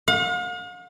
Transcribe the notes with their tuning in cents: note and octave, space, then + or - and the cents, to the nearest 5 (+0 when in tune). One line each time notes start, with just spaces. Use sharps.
F5 +45